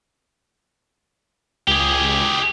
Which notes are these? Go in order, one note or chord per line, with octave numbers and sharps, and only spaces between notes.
C#2 G4 G#4